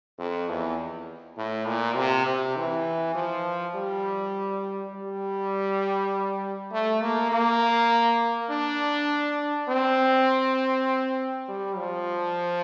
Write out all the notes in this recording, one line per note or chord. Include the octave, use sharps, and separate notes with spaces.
F2
E2
A2
A#2
C3
C3
E3
F3
G3
G3
A3
A#3
A#3
D4
C4
G3
F3